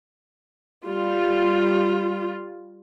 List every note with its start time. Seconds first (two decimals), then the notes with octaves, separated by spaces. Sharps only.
0.87 G3 F4